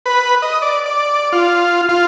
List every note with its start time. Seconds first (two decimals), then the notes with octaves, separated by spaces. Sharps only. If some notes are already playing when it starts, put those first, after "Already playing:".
0.06 B4
0.42 D#5
0.62 D5
0.86 D5
1.33 F4
1.89 F4